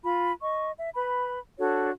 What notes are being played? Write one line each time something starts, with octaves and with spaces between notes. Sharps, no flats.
F4 B5
D#5 C#6
E5
B4 B5
D4 F#4 A4 C#5